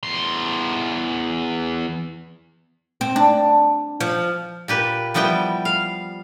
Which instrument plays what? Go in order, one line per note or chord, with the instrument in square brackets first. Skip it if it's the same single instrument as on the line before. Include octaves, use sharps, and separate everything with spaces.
[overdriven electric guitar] E2 C6
[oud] C4
D4
F3
[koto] A#2 G4 B4
F3 G3 B3 E4 G5
F5